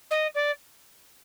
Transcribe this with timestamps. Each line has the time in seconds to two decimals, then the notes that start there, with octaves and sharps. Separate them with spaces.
0.11 D#5
0.35 D5